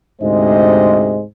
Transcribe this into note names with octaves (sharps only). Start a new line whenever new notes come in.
D2 G#2 C3 G#3 C5 D#5